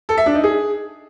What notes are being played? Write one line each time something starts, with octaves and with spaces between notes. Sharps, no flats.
A4
E5
D4
D#4
G#4